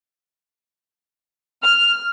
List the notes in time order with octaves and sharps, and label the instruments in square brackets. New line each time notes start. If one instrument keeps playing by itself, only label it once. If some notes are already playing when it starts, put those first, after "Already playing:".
[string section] F6 [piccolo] F7